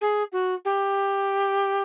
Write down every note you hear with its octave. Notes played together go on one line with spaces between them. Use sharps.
G#4
F#4
G4